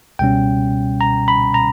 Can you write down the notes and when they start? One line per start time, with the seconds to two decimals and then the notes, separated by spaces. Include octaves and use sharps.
0.19 C#2 B2 G3 C#4 G5
1.01 A#5
1.28 B5
1.54 A#5